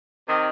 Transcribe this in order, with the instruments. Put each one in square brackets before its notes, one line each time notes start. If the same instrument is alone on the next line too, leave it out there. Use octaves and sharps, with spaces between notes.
[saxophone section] C3 D#3